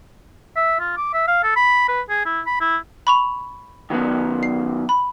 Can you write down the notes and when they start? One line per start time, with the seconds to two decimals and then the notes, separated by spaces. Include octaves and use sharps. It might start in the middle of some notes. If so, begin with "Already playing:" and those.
0.56 E5
0.80 F4
0.97 D6
1.13 E5
1.27 F5
1.43 A4
1.56 B5
1.88 B4
2.09 G#4
2.25 E4
2.46 B5
2.60 E4
3.07 B5 C#6 F7
3.90 D#3 F#3 B3
4.43 C7
4.89 B5